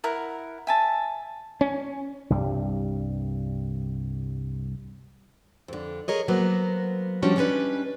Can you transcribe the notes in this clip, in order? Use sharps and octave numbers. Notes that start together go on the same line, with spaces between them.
E4 A#4 F#5
E5 G#5 A5
C#4
C2 G2 G3
F2 D3
G#4 A#4 C#5 D#5
F#3 A#3 B3 C5
F3 G3 C#4 D4 F#4
G3 G#3 C#4 D4 B4